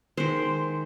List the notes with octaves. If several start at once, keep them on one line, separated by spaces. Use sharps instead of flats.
D#3 G#3 C5